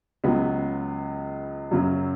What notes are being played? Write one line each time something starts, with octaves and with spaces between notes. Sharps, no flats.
C#2 C#3 F#3 B3
F#2 C#3 F#3